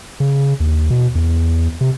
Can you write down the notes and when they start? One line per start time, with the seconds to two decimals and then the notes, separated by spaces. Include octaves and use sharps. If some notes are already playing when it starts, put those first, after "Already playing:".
0.20 C#3
0.60 D#2
0.90 B2
1.15 E2
1.81 C3